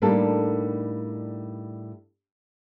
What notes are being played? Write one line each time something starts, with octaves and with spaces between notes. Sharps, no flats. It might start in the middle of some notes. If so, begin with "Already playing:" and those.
A2 G3 A#3 D4 D#4 A4